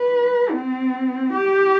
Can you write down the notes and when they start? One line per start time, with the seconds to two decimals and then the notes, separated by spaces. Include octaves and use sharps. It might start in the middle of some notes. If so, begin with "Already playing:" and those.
Already playing: B4
0.52 C4
1.33 G4